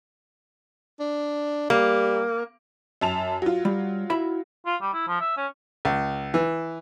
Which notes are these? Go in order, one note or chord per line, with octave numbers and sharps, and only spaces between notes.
D4
G3 A#3
F#2 A5 F7
F#3 F4
G3
E4 E5 B5
F4
G3
E4
F3
E5
C#4
C#2
E3